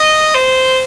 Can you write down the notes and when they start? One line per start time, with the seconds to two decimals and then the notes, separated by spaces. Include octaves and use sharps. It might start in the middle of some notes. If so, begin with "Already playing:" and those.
Already playing: D#5
0.34 C5